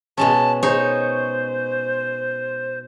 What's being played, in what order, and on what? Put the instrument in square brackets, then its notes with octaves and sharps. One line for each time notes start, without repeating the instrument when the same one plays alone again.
[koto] B2 G#3 C#4 [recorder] A5
[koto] D#4 G#4 C#5 [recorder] C5